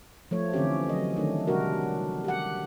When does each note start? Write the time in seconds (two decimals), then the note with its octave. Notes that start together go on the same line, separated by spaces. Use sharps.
0.31 F3 A3 C#5
0.53 D3 E3 C4 C#4 G4
0.89 F#3 D#5
1.17 D#3 A3 D4
1.47 C3 G3 D4 F#4 A#4
2.24 G4 F#5